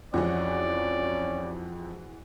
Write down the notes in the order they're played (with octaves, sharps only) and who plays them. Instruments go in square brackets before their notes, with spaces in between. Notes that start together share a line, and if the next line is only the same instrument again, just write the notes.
[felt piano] F2 [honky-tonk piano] E3 G#3 F#4 [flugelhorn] C#4 [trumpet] D5